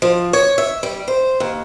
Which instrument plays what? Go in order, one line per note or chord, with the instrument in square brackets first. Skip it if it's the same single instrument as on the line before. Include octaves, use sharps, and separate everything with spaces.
[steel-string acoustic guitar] F3
C#5
E5
G3
C5
D#2